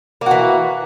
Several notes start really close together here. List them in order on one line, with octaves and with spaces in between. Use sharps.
A#3 F#4 E3